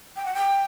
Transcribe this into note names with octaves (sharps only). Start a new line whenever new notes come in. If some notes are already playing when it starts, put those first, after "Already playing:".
G5
F#5
G5